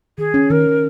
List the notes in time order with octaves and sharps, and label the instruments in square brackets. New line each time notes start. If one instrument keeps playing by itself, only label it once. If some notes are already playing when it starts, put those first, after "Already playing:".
[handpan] D#3 [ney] G#4
[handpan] C#4
[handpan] D#3 [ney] A#4
[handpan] D#3